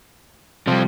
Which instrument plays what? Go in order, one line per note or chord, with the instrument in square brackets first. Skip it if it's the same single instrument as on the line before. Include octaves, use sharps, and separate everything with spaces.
[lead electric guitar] C3 G3 [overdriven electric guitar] F3 C4